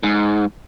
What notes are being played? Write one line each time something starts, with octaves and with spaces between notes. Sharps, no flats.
G#2